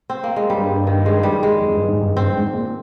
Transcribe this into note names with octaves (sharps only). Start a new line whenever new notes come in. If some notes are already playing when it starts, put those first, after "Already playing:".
C4
A#3
G#3
G2 G3
D#3
G#3
G3
G#3
F2
G2
G#2
G2
G2 C4
G#2
A#2